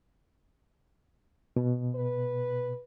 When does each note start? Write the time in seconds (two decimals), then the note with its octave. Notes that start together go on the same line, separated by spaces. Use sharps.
1.56 B2
1.95 B4